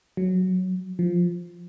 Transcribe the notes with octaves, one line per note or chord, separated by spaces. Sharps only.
F#3
F3